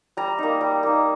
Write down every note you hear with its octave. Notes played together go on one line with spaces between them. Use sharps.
G3 A#5
A#3 D#4
G3
A#3 D#4